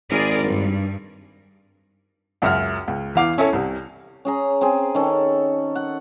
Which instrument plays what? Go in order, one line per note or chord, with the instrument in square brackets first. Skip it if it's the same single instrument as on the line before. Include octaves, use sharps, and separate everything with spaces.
[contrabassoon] G#1 [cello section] G#4 A#4 D5
[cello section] G2
[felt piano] C#2 F#2 F#4 E5 F#5 F6
C#2
E2 E3 F5 D6
C#4 E4 A4 C#5
C2 C3
[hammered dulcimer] C#4 G#4 A#5
C4 G#4
D#3 C#4 A4
F#5